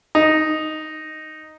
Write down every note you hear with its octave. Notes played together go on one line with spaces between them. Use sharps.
D#4